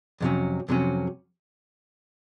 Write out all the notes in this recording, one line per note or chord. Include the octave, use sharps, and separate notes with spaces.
F2 C3 F#3 C#4
F2 C3 F#3 C#4